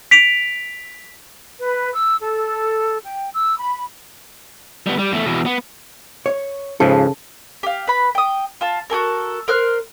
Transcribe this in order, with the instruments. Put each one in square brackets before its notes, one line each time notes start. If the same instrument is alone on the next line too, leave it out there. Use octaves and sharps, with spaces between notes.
[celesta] B6 D7 F7
[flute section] B4
E6
A4
G5
E6
B5
[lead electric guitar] G3 B3
G3
E2 A3
E2 B2
B3
[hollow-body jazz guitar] C#5
[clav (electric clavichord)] G#2 F3 [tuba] C#3 [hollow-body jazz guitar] A4
[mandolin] G4 F5
B4 B5
G5 D#6
F4 A5
F#4 G4 A4 A#4
A#4 C5 F6 F#6